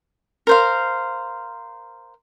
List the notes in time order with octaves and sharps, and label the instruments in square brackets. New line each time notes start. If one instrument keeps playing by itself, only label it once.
[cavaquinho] A#4 C5 F5